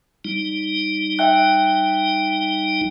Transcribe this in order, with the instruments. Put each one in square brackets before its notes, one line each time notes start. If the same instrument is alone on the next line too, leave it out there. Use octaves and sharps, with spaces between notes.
[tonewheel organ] G3 D#4
[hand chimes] E5 G5 F#6